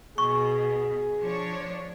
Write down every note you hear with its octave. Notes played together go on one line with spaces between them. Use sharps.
B2 G#4 C#6
F3 D4 C#5